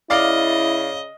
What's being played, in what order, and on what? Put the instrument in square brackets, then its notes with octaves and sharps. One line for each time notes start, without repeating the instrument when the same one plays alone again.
[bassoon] C#3 [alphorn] E4 [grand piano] D5 F5 D6 [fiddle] D#5